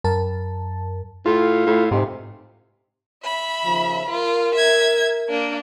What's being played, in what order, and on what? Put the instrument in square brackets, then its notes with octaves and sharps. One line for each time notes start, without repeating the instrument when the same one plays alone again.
[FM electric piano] F#2 A#4 A5
[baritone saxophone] A2 [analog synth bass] F4
[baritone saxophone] A2
[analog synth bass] G#2 [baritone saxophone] C3
[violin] E5 B5
[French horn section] D#2 C#3 F3
[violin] F4 [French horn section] A#4
[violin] E5 G#6
A#3 D4